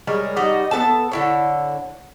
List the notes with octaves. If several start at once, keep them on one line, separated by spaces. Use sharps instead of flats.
G3 G#3 A#4 C#5
G3 D#4 F#4 D#5
B3 D#4 A4 A5
D3 E4 C#5